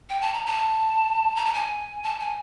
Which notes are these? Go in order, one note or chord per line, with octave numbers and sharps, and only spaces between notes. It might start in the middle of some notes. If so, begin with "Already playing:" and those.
G5
A5
A#5
A5
A#5
A5
G#5
A5
G#5